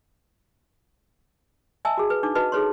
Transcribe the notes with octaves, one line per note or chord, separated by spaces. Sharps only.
D#5 E5 G#5 A5 E6
F#4 G#4
B4
D4 D#4 D6
F#4 B4 D#5 A5
D#4 G#4 A4 B4 C#5 C6